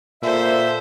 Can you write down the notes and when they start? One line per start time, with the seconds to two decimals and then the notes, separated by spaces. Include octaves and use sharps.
0.23 A#2 A4 C5 E5